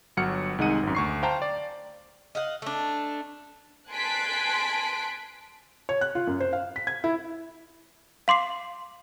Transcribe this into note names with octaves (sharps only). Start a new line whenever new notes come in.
G1 F#3 F#5 F6 C#7
C2 D#3 G#3 D#4 F#5 D#7
G#1 F#2
D2 C#6 C7
C5 F5 G5 A5 A#5
D5
D#5 F5 F#5
A3 D4
G#5 A5 C6 F#6 B6 D7
C#5
F#6
F4
F#2
C5
F5
B6
G#6
E4
F5 C6 D6 C7